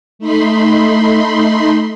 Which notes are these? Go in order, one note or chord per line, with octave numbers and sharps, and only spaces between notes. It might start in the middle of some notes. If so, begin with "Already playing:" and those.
A3 D#4 B5 C6